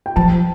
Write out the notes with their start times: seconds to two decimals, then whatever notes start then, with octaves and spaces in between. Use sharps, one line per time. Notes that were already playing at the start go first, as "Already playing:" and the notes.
0.06 G5
0.16 F3 A5